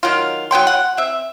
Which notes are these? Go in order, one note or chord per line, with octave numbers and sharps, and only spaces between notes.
D#3 F#3 F4
F#3 B3 G5 C6
F#5
C4 E5